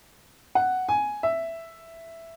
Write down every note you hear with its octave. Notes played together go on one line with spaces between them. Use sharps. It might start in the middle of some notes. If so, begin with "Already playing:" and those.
F#5
G#5
E5